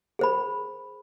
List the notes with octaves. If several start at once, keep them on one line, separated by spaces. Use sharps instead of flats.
G#4 C5 B5